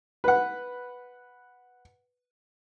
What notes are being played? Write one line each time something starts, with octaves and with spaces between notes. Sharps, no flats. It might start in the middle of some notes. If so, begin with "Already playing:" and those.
B4 F#5